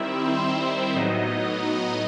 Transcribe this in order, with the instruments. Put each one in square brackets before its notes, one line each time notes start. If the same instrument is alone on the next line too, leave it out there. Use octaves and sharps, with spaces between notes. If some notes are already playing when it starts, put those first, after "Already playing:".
Already playing: [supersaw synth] D#3 G3 C4 E4 E5
C4 C5
C4 C5
A2 F#3 B3 D#4 D#5